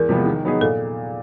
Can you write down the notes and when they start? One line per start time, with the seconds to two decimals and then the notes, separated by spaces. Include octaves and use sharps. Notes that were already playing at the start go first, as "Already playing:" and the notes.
Already playing: E2 A#4
0.09 C3 F3 G#3 B3
0.26 D#3
0.44 F#3 B3 D#4 G#4
0.61 A#2 A4